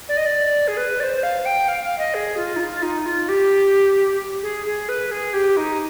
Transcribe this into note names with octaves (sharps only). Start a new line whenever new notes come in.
D5
D#5
D5
G#4
B4
D5
C5
F5
G5
F5
F5
D#5
G#4
F4
D#4
F4
D#4
F4
G4
G#4
G#4
B4
G#4
G4
D#4